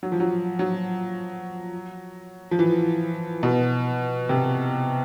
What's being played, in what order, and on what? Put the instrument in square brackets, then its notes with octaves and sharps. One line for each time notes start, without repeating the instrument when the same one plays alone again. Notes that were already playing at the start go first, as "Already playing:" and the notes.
[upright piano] F#3
F3
F#3
F#3
F3
E3
B2
C3